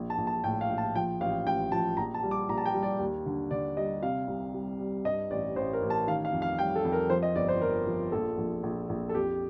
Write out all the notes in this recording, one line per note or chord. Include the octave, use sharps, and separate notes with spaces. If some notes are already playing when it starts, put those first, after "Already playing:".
Already playing: A#1
A5
A#1
A5
A2 G5
F5
A#1
A5
F3 G5
A1 F5
A1 G5
F3 A5
A#1 A#5
A5
G3
D6
A#1 A#5
A5
G5
G3
D5
D#2
D3
D3 D5
G3 D#5
C3 F5
C2
G3
G3
G2 D#5
A1 D5
A1 C5
A#4
A1
A5
D#3 F5
F5
F2
F5
G3 G5
A4
F2
A#4
F3 C5
D#5
G1 D5
C5
F3 A#4
F3
A#1 A4
A#1
A#1
A#1
A4
F2 G4